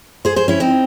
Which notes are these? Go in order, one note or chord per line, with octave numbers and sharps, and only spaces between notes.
G#4 C5
G#4 C5
C#4 E4
C4 D#4